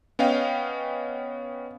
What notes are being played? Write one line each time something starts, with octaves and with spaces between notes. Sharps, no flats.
B3 C#4 D#5 F5 G5